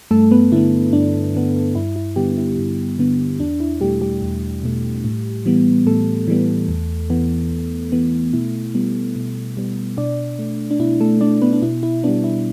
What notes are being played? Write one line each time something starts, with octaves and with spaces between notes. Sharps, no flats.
G2 A3 A4
B3 B4
D3 B3 E4
G2 D4
D3 B3
G2 E4
E4
D3 G3 B3 G4
E4
G2
D3 B3
E2 D4
E4
B2 G3 A3 G4
G3 G4
E2
B2 A3
A2
E3 G3 B3
A2 A3 A4
E3 G3 B3
E2
E3 B3
E2
E3 B3
B2 E4
G3 B3
B2
G3 B3
B2 D4 D5
A3
D4
B2 E4
A3 A4
A3 D4 D5
B3 B4
D4
B2 E4
E4
G3 B3 D4
E4